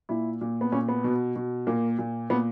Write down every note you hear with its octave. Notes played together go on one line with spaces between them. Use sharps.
A#2 E4
A#2
B3
A#2 C#4
B3
B2
B2
A#2 A#3
A#2
A#2 B3